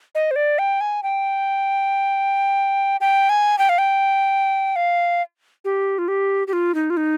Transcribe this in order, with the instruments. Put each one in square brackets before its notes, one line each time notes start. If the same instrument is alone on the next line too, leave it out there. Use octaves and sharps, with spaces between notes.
[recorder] D#5
C5
D5
G5
G#5
G5
G5
G#5
G5
F5
G5
F5
G4
F4
G4
G4
F4
D#4
F4
D#4